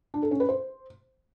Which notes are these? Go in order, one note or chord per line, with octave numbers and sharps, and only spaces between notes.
D4
A4
C#4
B4
C5